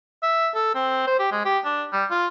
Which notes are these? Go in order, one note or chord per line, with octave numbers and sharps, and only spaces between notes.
E5
A4
C4
C5
G4
G#3
G4
D4
G3
F4